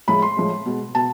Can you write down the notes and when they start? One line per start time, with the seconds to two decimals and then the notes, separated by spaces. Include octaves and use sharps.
0.08 A2 F3 G#3 B5
0.22 C6
0.37 A2 F3 G#3
0.66 B2 G#3
0.95 B2 A5